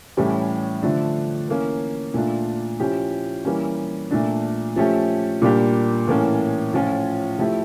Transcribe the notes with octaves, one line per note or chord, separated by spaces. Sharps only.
A2 E3 G3 C#4
D3 F3 A3 D4
E3 A#3 C#4
A#2 A3 D4 F4
F3 C#4 E4 G4
E3 G3 A#3 C#4
A#2 A3 D4
F3 A3 C#4 G4
A#2 G3 A#3 D4 G4
A2 E3 A#3 C#4
A2 F3 C#4 F4
F3 A3 E4 G4